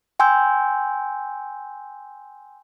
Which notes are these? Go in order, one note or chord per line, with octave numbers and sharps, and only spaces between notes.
G5 G#5 C6 E6 G6